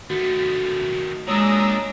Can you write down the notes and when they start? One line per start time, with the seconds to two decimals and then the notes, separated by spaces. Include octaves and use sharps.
0.10 D#3 A3 F#4
1.28 A#2 G#3 D4 C#5 A#5 D#6 E6